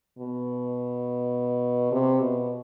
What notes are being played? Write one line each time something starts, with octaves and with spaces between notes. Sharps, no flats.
B2
C3
B2